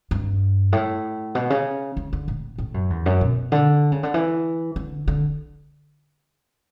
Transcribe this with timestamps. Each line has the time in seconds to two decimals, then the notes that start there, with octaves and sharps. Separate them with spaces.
0.11 G2
0.72 A2
1.35 B2
1.50 C#3
1.97 C#3
2.13 D3
2.28 A2
2.58 A2
2.74 F#2
2.90 E2
3.06 F#2
3.21 B2
3.52 D3
3.92 C#3
4.03 D3
4.14 E3
4.76 D3
5.08 D3